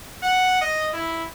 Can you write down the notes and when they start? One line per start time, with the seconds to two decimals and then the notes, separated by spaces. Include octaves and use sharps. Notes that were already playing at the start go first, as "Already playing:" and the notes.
0.23 F#5
0.61 D#5
0.93 E4